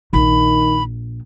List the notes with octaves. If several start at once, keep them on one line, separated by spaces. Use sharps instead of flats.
A#1 D#3 B5